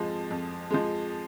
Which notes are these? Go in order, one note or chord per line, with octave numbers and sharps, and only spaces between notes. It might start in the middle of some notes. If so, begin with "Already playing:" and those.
Already playing: F2 F3 G#3
F2
F3 G#3